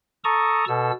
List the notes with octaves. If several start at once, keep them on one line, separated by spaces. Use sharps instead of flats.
A4 A5 A#5 C#6 D#6
B2 A4 E6